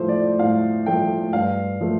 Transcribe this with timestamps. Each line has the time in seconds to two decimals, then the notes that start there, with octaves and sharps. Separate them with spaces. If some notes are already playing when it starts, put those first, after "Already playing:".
Already playing: A2 F3 A3 C5
0.08 D5
0.39 A2 F5
0.86 F3 A3 G5
1.33 G2 F5
1.81 F3 A3